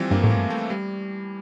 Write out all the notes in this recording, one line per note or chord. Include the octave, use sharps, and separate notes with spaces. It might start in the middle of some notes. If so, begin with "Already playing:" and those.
Already playing: E3 F3 G3 C4
G2 A#3
A2 A3
A#3
G2
A3
G3